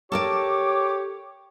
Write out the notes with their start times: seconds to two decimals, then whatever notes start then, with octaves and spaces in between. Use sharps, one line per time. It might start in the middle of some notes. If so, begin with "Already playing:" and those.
0.12 G4 A4 A#4 C#5 D5 D6